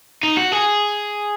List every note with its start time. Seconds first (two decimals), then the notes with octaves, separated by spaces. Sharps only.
0.23 D#4
0.37 F#4
0.52 G#4